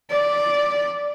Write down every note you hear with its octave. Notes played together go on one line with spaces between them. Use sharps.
D5